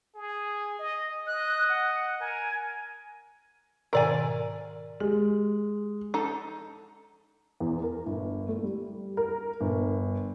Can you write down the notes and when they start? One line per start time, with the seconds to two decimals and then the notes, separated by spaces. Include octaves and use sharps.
0.15 G#4
0.79 D#5
1.27 D#5 F#6
1.69 F#5
2.20 A#4 G#5
3.93 G#2 B2 D#3 A#4 D5 G#5
5.00 G#3 G4
6.14 D#4 A4
7.60 E2
7.83 A#4
8.06 G1
8.48 A3
8.63 G3
9.17 A#4
9.61 G1